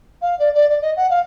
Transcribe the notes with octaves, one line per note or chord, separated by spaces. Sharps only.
F5
D5
D5
D5
D#5
F#5
F5